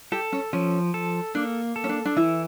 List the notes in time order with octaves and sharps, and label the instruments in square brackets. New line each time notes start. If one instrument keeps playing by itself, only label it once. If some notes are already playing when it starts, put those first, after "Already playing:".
[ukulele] G4 [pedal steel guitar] A4
[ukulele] C#4
[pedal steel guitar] F3 [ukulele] C#4
[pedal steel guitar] A4
[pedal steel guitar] A#3 [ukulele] D4
[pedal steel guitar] A4
[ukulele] C#4
D4
D4
[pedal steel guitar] E3 [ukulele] E4